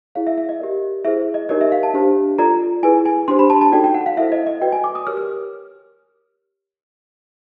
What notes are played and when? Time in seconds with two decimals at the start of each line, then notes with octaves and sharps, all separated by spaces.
0.15 E4 G#4 C#5 F5
0.27 E5
0.38 E5
0.49 D#5
0.60 G4 A#4 D5
1.05 E4 G#4 C5 E5
1.34 D#5
1.49 D#4 G4 A#4 C#5 D#5
1.61 E5
1.72 F5
1.83 A5
1.94 D4 G4 C5
2.38 F4 A4 D5 A#5
2.83 E4 G#4 B4 G#5
3.05 G#5
3.28 D4 G4 C5 C6
3.39 B5
3.50 A5
3.61 A5
3.72 D#4 F#4 A4 D5 G5
3.84 G5
3.94 F#5
4.06 F5
4.17 E4 A4 C5 E5
4.32 D#5
4.47 D#5
4.61 F#4 B4 D5 G5
4.72 G#5
4.84 D6
4.95 D#6
5.07 G4 A#4 C#5 F6
5.17 F6